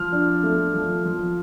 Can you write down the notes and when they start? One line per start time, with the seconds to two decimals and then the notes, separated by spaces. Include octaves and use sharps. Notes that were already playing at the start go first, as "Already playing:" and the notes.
Already playing: F3 F6
0.12 D4
0.43 A3
0.73 F3
1.04 F3